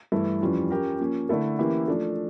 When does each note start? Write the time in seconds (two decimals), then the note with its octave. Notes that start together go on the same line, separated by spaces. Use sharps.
0.12 G2 E3 A3 E4 A4
0.41 F2 E3 G3 C#4 F4
0.70 F3 C#4 G4 A#4
1.00 F3 A#3 C#4
1.29 D3 A3 E4 A4
1.59 E3 A#3 C#4 E4 G4
1.88 F3 A3 D4 A4